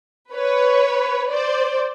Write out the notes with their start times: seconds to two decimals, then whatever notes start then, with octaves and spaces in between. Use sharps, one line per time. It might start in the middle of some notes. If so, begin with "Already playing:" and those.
0.33 B4 C#5
1.32 C5 D5